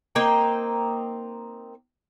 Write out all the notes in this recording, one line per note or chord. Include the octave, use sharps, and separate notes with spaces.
A#3 C4 D#4 G5